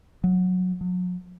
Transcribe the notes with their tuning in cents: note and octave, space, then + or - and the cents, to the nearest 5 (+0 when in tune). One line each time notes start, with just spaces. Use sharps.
F#3 -15
F#3 -45